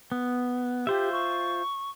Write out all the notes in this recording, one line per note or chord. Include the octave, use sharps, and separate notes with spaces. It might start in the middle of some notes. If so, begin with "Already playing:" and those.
B3
F4 G4 C5 E5
C#6